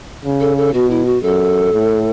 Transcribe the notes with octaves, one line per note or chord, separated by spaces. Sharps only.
C#3
A4
A4
B2 F#4
E4
F#4
F#2 A4
A2